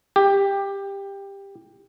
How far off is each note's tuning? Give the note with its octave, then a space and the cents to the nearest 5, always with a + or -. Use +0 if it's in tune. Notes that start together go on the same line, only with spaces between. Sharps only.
G4 +15